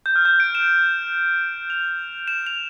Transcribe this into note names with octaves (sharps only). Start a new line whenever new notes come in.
G6
F6
G6
D7
E7
F7
E7
F7